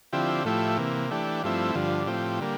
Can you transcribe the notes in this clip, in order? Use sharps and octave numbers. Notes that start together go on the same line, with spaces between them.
D3 F3 C4 E4 G4
A2 F3 A3 E4 G4
C3 E3 A#3
E3 A3 D4 G4
G2 F3 A3 C4 E4
G2 D3 F3
A2 F3 C4 G4
D3 G3 A#3